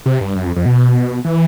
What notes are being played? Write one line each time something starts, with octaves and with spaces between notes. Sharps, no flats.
C3
G2
F#2
F2
F2
B2
E3